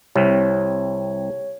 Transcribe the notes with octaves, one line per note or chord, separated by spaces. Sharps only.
C2 C3 C#5